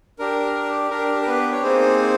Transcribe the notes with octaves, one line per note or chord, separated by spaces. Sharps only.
D4 G4 A#4
D4 G4 A#4
A#4
B3 B4
C#5
A#3 C4 D#4 G#4 C5